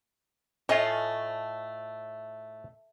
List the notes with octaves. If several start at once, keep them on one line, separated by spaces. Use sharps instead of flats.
A2 A3 F4 C#5 D#5 G#5